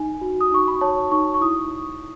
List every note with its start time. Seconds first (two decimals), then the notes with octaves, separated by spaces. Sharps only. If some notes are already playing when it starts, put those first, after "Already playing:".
Already playing: D#4 G#5
0.21 F#4
0.41 D#6
0.51 D#4 C#6
0.68 B5
0.81 C#5 A5
1.12 D#4 C#6
1.34 C#6
1.41 E4 D#6